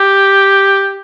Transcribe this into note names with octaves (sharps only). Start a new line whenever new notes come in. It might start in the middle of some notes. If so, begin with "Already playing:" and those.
Already playing: G4